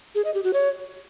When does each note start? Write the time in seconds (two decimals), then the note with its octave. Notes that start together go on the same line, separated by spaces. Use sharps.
0.15 G#4
0.25 D#5
0.34 G4
0.44 F#4
0.53 C#5